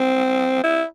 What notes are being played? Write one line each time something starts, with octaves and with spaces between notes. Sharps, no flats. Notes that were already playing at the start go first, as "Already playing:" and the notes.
Already playing: C4
E4